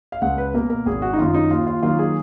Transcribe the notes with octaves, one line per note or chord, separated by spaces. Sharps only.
F5
C#2 F#5
B4
B2 A#3 A#4
A#4
G#1 G#4
F#4
D#4
F#2 D#3 F4
D#4
D#2 F4
F4
D#3 F#3 A#3 F4
G#4